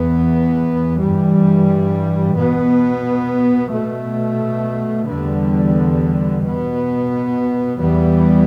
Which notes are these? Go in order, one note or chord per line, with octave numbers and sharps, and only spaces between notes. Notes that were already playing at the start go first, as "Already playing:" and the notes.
Already playing: E2 E3 B3
G2 E3 G3
B2 B3
B2 A3
E2 D3 G3 B3
B2 B3
E2 E3 G3 B3